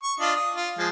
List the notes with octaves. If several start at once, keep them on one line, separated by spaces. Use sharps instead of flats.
C#6
D4 F4 D#5
D#6
F4
F3 G#3